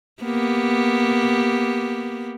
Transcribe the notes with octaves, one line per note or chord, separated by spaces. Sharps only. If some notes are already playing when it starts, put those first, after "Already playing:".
A#3 B3 G4